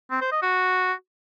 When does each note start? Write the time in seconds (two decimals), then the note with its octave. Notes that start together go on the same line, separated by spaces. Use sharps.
0.11 C4
0.21 C5
0.32 D#5
0.42 F#4